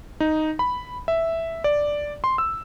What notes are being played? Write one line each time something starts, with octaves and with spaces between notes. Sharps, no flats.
D#4
B5
E5
D5
C6
E6